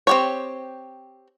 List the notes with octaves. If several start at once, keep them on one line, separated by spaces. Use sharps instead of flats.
C4 G4 C#5